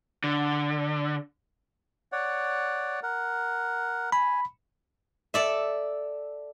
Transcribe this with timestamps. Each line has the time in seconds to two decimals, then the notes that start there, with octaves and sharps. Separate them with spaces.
0.24 D3
2.12 C#5 D5 F#5
3.03 A#4 F#5
4.12 G#5 B5
5.34 A4 D5 E5